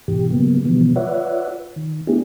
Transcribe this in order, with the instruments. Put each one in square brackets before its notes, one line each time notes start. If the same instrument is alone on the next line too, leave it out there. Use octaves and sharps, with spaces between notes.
[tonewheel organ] G#2 B2 E3 G4
C#3 F#3 G3 A#3 B3
B2 D3 E3 F3 G3 B3
F4 B4 C#5 D5 E5 F#5
D#3
A3 B3 D4 E4 G4 G#4